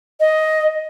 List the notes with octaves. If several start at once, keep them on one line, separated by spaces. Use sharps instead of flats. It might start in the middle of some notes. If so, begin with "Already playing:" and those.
D#5